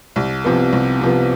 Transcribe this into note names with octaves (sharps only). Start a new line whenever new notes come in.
C2
C3 F3 B3
C2
C3 F3 B3